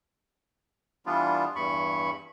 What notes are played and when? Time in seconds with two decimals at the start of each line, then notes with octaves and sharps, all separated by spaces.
1.06 E3 G3 B3 D4 F4
1.55 E2 G2 B5 C#6